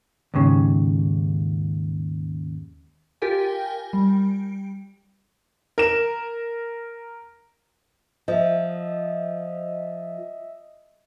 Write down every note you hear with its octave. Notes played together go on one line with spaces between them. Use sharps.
D#2 G#2 C#3
F4 G4 A#4 G5 G#5
G3
A#4 E7
F3 D#5 E5